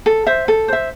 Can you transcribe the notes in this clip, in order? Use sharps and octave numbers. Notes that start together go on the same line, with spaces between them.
A4
C5 E5
A4
C5 E5